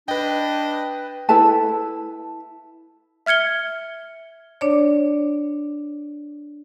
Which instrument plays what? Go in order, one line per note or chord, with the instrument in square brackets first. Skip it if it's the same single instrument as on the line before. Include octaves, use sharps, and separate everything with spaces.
[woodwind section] D4 [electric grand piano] B4 G5 [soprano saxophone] D#5
[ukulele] E4 A4 B4 A5
[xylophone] E5 F6 G#6 C#7 G7
[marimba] D4 C#5 D5